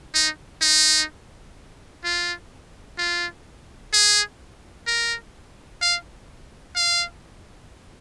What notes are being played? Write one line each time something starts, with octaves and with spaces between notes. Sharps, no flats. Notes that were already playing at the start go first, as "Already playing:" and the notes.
D#4
D#4
F4
F4
G#4
A#4
F5
F5